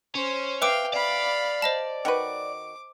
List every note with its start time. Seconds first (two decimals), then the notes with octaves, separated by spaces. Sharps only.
0.15 C#4 C5
0.62 B4 E5 F5 G5 D6 D7
0.93 D5 F5 B5
1.62 C5 D#5 A5
2.05 D#3 F#4 B4 D6